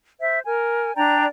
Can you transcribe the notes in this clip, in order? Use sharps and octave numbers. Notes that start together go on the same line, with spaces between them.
C5 E5
A#4 G#5
D4 D5 G5 A#5